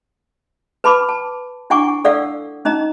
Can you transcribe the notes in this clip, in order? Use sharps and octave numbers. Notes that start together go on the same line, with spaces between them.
B4 A5 B5 D6
A5
D4 E4 F#5 G#5 C#6 D6
A4 D5 F5 F#5 E6
C#4 D#4 D#5 A#5